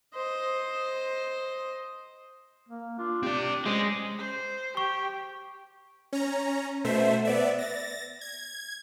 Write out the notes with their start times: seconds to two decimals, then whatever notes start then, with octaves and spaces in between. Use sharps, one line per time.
0.14 C5 D#5
2.69 A#3
2.99 D4 F4
3.23 C4 G4 D5
3.66 G#3 C#4 G4 C5
4.19 C5
4.77 G4 C#6
6.13 C#4 A#5
6.84 B2 A3 C5 E5
7.25 B3 D5 E5
7.58 A6 A#6
8.21 G#6